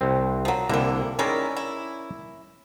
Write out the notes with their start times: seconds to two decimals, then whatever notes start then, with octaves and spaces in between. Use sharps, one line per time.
0.01 C2 C4
0.45 F3 F#3
0.69 C2 D3 G3 A#3 E4
1.19 D#3 G#3 C#4 E4 A#4 D5
1.57 E4